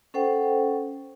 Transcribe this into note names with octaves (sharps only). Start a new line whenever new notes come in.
C#4 A4 C5 F#5 G5